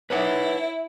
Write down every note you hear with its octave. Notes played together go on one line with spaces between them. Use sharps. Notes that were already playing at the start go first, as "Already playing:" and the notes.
E4 B4 C#5 F#5